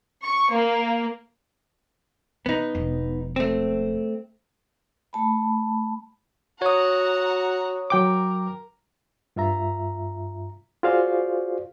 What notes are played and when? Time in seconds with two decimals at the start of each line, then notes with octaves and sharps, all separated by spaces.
0.21 C#6
0.51 A#3
2.46 C#3 E3 B3 D#4
2.75 E1 F3
3.36 A3 C4
5.13 A3 A5 B5
6.62 F#4 C#5 F#5 A#5 D#6
7.90 F#3 A#4 G5 D6
9.36 G2 F4 E5 A#5
10.83 F4 F#4 G#4 C5 D5 F5